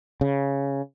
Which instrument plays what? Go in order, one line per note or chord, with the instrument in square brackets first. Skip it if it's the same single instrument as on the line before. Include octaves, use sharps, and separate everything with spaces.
[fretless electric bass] C#3